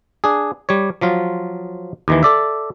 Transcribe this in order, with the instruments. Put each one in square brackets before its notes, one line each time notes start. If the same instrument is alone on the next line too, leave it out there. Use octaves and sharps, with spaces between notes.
[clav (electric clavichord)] D4 G#4
G3 C#5
F3 F#3 F4
D#2 D#3 E3
A4 D5 E5